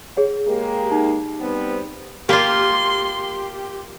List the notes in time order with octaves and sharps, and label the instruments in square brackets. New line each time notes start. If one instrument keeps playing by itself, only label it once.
[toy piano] G#4 C#5 F#5
[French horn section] G#3 A#3 G4
[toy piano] D#4
[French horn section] G3 B3 C4
[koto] A#3 F4 [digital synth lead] G4 [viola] C6